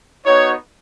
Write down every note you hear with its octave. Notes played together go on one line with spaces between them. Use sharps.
B3 D#4 F#4 C#5